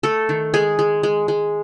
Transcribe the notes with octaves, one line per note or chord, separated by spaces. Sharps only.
A3 A4
D#3
G#3 G#4
G#3
G#3
G#3